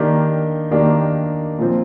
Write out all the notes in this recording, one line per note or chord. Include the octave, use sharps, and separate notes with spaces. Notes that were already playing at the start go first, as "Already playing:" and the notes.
Already playing: D#3 A#3 D4 G4
D#3 A#3 D4 G4
A#2 F3 C4